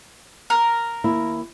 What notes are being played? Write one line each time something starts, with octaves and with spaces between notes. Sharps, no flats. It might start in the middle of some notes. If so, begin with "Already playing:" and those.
A#4
D#2 A#3 E4